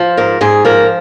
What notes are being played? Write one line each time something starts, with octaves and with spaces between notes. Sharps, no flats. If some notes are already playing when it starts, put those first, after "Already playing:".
Already playing: F3
G#2 A#4
G#2 G#4
F3 A#4